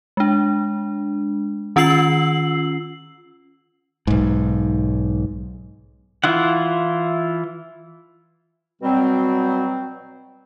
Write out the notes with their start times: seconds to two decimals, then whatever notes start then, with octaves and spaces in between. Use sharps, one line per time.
0.17 G#3 D4
1.76 D#3 C#4 F4 E6 C7 F#7
4.07 B1 G#2
6.24 E3 E4 F4 F#5
8.82 B2 F#3 G3 C4